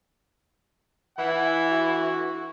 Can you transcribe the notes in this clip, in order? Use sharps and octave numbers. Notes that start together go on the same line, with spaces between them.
E3 E4 F#5
F#4